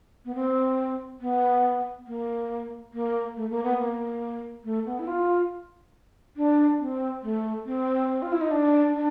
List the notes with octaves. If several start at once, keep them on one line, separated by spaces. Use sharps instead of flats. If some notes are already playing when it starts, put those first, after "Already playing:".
B3
C4
B3
A#3
A#3
A3
A#3
B3
A#3
A3
B3
E4
F4
D4
C4
A3
C4
F4
E4
D#4
D4
D4